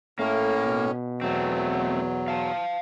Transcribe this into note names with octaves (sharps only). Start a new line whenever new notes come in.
A2 A3 A#3 C#4
B2
E2 F#3 A3 C4
F5 A5